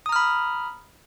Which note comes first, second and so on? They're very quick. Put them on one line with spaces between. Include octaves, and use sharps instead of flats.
D#6 A#5 F6 B5